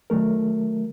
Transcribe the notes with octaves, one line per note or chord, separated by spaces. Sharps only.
D#3 F#3 A3 A#4